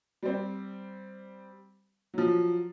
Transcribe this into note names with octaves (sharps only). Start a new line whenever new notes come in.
G3 C4
F3 F#3